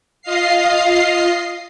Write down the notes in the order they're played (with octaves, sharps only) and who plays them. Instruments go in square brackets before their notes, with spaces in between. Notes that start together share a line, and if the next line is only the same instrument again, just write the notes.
[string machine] F4 D#5 F5 C7